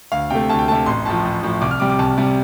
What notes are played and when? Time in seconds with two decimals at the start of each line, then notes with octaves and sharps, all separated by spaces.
0.12 D2 F5
0.30 C3 A3 G5
0.49 D2 A5
0.59 G5
0.68 C3 A3 A5
0.86 A1 C6
1.05 A2 F3 A5
1.24 A1
1.43 A2 F3
1.61 C2 D6
1.71 F6
1.80 C3 G3 D6
1.90 D6
1.99 C2 A5
2.18 C3 G3